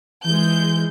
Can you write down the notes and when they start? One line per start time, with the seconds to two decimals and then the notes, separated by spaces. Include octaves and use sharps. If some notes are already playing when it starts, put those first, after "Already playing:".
0.24 E3 G#3 G6